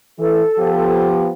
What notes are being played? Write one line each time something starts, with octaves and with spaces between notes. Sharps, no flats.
E3 A4
F3 B3 G4